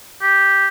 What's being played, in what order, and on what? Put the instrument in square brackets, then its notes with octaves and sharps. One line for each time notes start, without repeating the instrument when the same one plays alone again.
[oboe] G4